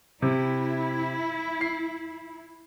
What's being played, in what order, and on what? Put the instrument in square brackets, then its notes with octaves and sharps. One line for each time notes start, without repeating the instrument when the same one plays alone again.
[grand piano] C3 [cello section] E4
[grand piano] C7